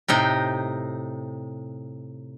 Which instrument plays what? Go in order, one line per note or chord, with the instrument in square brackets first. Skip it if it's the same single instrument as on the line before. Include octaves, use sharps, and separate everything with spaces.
[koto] A2 C3 D#4 G5